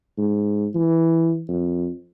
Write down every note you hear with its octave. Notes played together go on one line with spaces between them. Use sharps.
G#2
E3
F2